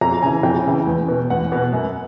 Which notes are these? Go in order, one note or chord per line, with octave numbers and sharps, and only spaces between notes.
F2 A#5
C#3 E3 G#5
F2 G5
C#3 E3
E2
B2
E2 F#5
B2
F#2